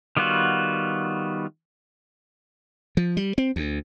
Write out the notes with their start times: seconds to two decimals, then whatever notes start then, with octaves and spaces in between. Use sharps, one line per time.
0.17 D#3 G3 B3 F4 F#4
2.97 F3
3.17 G3
3.38 C4
3.56 D2